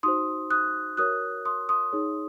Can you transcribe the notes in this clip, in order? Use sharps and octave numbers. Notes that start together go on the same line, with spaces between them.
D#4 F#4 C5 C6 D#6
D#6 F#6
F#4 A#4 C#5 D#6 F#6
C6 D#6
C6 D#6
D#4 G#4 C#5